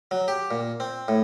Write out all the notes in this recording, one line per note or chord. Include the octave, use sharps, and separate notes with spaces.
F#3
G4
A#2
C4
A2